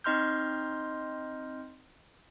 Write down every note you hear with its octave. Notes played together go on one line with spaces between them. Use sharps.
C4 D#4 D#5 C6 F6 G6